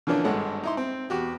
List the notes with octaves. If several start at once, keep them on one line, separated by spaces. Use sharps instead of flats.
D3 E3 F3 A#3 C#4 D4
G#1 G2 G#3 A4 C#5 F#5
D#4 E4 C6
C4
E2 F#4 G4